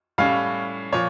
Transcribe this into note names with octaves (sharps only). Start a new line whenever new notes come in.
A2 G3 C#4 F5
A#2 F3 C#5